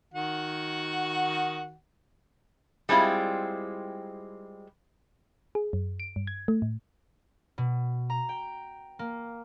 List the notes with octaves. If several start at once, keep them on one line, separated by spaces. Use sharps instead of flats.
D#3 F#4 F#5
G3 G#3 C4 E4 F4
G#4
F#2
D7
G2
G#6
A3
A2
B2
A#5
G5
A#3